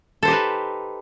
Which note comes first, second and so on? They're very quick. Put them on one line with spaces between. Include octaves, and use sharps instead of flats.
A4 C5 G4 D#4 B4